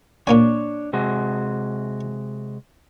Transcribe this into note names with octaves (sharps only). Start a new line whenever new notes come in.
A#2 A#3 D4 C#5 G#5
C3 G#3 F#4